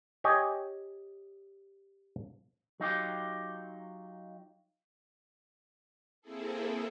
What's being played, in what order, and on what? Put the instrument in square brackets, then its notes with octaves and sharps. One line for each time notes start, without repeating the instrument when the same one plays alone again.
[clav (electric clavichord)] G4 C#5 D#5 G#5
[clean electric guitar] F#3 D#4 F4 G4
[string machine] A#3 C4 E4 G#4 A4